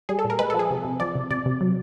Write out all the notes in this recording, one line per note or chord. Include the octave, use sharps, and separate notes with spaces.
G3 G#4
A4
A#2
A#4
G#3 B4
A4
F3
G#4
C3
C3
F3 D5
C3
C3 D5
C3
F#3